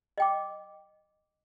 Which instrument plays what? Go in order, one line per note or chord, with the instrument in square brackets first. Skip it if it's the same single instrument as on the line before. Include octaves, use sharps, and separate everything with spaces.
[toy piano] D#5 G5 D6